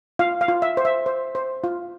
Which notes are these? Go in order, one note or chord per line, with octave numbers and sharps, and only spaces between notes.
F4 F5
F5
F4
E5
C5
E5
C5
C5
F4